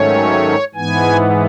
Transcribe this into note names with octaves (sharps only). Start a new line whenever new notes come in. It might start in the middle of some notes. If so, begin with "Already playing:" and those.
Already playing: G#2 D#3 F#3 A3 C#4 C#5
G#2 E3 B3 G#5